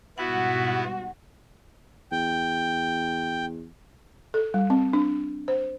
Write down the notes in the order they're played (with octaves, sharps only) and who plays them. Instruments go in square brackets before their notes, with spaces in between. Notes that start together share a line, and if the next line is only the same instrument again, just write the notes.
[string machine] G#2 B2 G3 [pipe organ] B3 E4 [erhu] F#4 [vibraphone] F#5
[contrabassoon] E2 [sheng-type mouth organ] G5
[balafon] A4
G3
C4
D4
C5